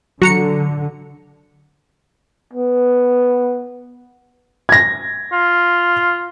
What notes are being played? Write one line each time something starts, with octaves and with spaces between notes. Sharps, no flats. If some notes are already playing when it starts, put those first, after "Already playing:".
D3 F#3 F#4 A#5 C#7
B3
G#6 A#6
F4